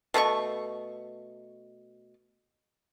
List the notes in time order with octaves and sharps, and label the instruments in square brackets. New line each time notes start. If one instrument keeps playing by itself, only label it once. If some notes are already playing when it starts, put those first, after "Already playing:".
[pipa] B2 A3 D#4 C#6